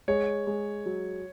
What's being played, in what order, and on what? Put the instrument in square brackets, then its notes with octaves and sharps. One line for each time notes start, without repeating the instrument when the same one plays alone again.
[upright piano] G#3 [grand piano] C#5
[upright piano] G#3
F#3